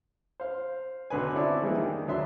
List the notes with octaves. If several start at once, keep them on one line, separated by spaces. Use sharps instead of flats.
C5 F5
B1 D3 B4 G#5
C4 C#4 E4 A4 D5 G#5
E3 G3 G#3 A#3
D#3
D2 F#3 D4 E5 C6 E6